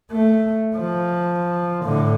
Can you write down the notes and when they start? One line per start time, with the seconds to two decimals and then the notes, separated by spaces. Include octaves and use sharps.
0.11 A3
0.76 F3
1.83 A2 D3